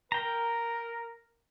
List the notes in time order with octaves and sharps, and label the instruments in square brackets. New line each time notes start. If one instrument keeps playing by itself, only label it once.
[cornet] A#4 [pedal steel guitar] G5 A#5